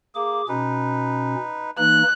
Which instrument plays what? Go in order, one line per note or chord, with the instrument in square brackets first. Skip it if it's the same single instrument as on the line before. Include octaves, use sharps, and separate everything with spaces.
[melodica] A#3 [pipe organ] G#4 D6
[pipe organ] B2 C#4 [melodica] D#4 B4
[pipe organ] E3 A#3 D#4 [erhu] F#6